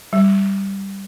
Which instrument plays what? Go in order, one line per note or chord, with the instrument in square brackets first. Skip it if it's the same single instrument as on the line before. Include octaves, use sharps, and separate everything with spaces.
[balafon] G3